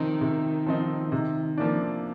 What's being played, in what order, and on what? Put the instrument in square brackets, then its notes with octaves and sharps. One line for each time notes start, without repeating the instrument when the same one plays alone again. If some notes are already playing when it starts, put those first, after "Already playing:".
Already playing: [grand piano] C3 F3 C4 D#4 [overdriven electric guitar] D#3
[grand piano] C3
F3 C4 D#4
C3
F3 A#3 D4